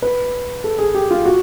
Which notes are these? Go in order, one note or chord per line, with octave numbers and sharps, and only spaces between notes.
B4
A4
G#4
G4
F4
F#4